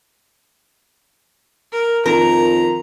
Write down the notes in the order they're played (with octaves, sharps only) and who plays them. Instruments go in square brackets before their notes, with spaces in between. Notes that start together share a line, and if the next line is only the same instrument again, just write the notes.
[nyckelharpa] A#4
[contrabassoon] F2 [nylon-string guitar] D#3 [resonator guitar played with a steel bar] A#4 [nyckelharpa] A#5